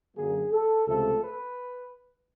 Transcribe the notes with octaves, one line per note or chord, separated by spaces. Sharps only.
F#2 D3 F#3 A#3 G#4
A4
C#2 C3 F3 A3 A4
B4